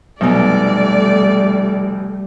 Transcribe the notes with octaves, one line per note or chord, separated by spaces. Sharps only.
F1 B2 F#3 G3 A3 B3 D5 G#5